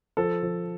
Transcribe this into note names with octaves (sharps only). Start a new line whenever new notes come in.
F3 A4
F3